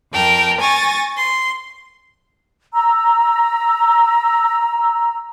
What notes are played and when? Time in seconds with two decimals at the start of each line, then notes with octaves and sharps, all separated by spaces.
0.12 F2 A#4 G5 A5
0.59 G#5 C#6 A6 A#6
1.16 C6
2.73 A#5 E6